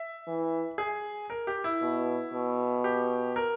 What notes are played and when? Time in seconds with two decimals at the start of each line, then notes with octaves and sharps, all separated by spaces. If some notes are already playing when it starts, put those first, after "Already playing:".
Already playing: E5
0.27 E3
0.78 G#4
1.30 A#4
1.47 G4
1.64 E4
1.82 B2
2.34 B2
2.84 G4
3.36 A#4